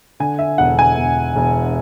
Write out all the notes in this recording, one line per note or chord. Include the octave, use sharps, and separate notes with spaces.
D3 G#5
E5
E1 F#5
G#5
E1
E1